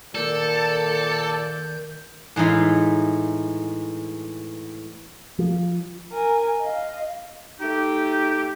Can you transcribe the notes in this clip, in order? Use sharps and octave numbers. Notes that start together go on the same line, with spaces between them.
A#2 D#3 A4 D5 G6
A2 E3 G#3 D#4 F5
F3
A#4 G#5
D#5 F5
A3 D#4 G4